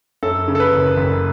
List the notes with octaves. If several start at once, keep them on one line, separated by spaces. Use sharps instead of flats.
F#2 A4
C#3
A4
B4
F#1
F#1